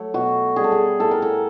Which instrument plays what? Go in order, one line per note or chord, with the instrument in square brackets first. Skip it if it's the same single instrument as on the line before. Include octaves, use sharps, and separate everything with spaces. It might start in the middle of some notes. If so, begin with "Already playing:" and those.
Already playing: [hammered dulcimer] F#3 A3 C#5
B2 F#4
G3 G#4
A4
G#4
A2 A4
A#4
A4